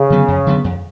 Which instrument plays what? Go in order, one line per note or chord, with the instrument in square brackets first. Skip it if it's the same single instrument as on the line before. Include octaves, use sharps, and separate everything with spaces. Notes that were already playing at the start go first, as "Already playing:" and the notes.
Already playing: [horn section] C#3
[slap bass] D3 F#3 B3
F2
D3 F#3 B3
F2